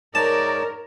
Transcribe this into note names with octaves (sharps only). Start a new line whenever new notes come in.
G#2 D#4 A#4 C#5 D5 A5